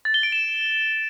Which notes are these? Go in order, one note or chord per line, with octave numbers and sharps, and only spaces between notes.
A6
G7
D7
E7